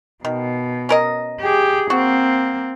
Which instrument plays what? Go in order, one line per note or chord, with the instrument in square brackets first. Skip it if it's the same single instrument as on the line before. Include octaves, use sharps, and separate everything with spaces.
[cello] B2 [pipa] D#3
[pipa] C#4 A#4 D#5
[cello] G4 G#4
[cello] A#3 C4 [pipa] F#4